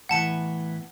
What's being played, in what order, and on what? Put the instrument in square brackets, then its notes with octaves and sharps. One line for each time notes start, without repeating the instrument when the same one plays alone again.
[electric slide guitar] A2 E3 B3 [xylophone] F#5 A5 C#7